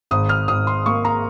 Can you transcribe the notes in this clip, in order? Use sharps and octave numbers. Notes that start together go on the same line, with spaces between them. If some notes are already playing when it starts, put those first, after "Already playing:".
G#1 D#6
F6
G#1 D#6
C6
A#3 C#6
A#5